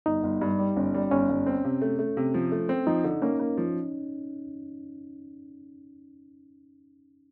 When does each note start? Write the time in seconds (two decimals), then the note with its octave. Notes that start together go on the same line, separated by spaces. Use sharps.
0.06 G1 D#4
0.24 G1
0.41 G2
0.59 G3
0.76 G1 C#4
0.94 G3
1.11 G1 C#4
1.29 G1
1.46 C4
1.65 C3
1.82 A3
1.99 A3
2.17 C3
2.34 F3
2.52 A3
2.69 C4
2.87 F3 D#4
3.04 D3
3.22 A#3 C#4
3.39 A#3
3.57 F3